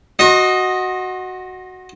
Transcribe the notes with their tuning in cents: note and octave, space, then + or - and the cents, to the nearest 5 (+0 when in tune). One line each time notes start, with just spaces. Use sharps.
F#4 +0 D#5 +0 C6 +40